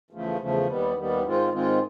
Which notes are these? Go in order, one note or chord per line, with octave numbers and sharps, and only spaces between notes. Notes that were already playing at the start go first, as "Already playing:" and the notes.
E2 C#3 F3 A3
E2 C#3 F3 A3
D#2 D#3 G3 B3
D#2 D#3 G3 B3
G#2 D#3 G#3 C4 F4
G#2 D#3 G#3 C4 F4